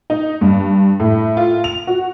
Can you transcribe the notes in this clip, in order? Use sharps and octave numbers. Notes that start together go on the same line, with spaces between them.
D#4
G2
A2
F4
F7
F#4